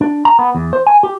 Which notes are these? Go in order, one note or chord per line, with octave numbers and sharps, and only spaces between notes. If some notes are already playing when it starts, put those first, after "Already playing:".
D4
A#5
B3
E2
C5
G#5
G4